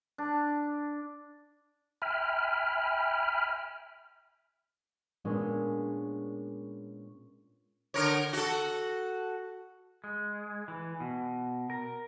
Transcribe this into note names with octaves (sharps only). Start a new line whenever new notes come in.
D4
E5 G5 G#5 B5 F6
A#2 G#3 B3 C#4 D4
D3 A#4 C#5
F#4 A4
G#3
E3
B2
A#4